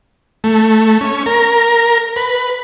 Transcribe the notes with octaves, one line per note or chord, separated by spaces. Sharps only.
A3
C#4
A#4
B4